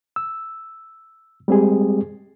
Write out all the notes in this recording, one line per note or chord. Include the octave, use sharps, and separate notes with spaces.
E6
G3 G#3 C4 G4 G#4